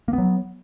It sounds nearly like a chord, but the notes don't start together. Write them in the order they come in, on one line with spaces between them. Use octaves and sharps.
A#3 B3 F#3